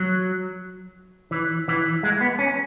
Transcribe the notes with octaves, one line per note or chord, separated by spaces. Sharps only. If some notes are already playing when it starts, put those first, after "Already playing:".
Already playing: F#3
E3
E3
G#3
B3
C#4